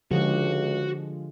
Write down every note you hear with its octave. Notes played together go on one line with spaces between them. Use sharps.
C#2 D3 F3 G#3 F#4 G4